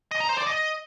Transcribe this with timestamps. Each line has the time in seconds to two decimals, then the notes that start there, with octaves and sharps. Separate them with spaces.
0.11 D#5
0.20 A#5
0.29 C5
0.38 D5
0.47 D#5